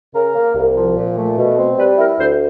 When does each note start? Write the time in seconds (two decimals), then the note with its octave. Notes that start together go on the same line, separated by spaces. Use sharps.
0.14 C#3 A#4
0.36 A#3
0.55 C2
0.76 F3
0.96 A#2
1.17 A3
1.37 B2
1.57 C4
1.78 G3 B4
1.98 E4 A#4
2.18 D2 C5